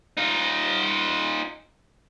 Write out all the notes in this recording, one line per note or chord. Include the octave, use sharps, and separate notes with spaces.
D#4 F4